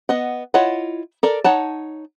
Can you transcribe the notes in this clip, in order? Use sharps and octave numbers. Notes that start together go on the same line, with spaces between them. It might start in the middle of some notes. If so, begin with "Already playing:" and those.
B3 D#5 F#5
E4 F4 C#5 D#5 F#5
A4 A#4 D5
D#4 C#5 F#5 A5